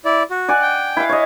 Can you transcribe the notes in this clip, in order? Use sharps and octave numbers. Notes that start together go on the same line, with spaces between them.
E4 D5
F#4
D5 F#5 G#5
G5
E4 F5
C#5 D#5